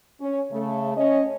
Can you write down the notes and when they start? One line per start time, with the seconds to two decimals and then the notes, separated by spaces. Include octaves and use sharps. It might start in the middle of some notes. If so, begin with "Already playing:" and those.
0.19 C#4
0.51 C#3 A3
0.96 C#4 D#5